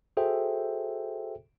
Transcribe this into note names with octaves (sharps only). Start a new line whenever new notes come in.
F#4 G#4 A4 C5 E5 G5